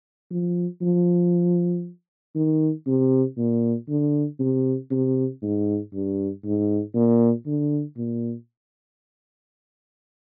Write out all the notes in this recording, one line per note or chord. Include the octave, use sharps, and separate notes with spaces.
F3
F3
D#3
C3
A#2
D3
C3
C3
G#2
G2
G#2
A#2
D3
A#2